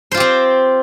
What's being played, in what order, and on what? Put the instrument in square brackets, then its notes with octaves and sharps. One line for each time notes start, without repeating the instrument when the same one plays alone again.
[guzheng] C5
F4
G4
C4